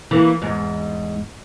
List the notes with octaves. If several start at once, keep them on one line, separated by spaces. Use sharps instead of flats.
E3 A#3
E2 G#2